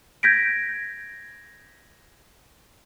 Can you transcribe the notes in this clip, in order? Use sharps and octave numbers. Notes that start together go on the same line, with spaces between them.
G6 G#6 A#6 B6 D7